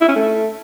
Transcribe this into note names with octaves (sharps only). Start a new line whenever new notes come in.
E4
C#4
A3